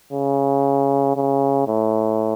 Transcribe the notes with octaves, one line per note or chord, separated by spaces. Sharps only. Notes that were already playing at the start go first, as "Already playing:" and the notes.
C#3
C#3
A2